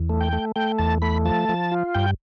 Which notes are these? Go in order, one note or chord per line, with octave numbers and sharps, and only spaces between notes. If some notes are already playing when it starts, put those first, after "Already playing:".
Already playing: E2
A3
G5
A3
A3 G5
E2 A5
A3 B5
F3 A5
F3
F4
G2 G5